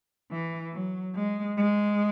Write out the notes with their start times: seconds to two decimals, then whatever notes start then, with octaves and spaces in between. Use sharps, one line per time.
0.31 E3
0.73 F#3
1.15 G#3
1.57 G#3